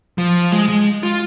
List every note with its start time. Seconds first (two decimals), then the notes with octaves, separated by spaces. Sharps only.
0.18 F3
0.52 G#3
0.68 G#3
1.03 F4